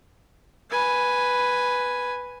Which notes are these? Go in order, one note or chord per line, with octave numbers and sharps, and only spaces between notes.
B4 G#5